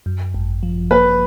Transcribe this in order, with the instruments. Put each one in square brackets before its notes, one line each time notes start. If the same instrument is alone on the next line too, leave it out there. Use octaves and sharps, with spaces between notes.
[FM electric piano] F#2
G#1
F3
[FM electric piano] A#3 [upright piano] B4